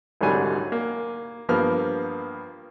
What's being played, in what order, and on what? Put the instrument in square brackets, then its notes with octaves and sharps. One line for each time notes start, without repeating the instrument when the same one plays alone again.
[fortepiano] C2 G#2 D3 F#3 G3 G#5
A#3
G2 F3 A#3 B3 F6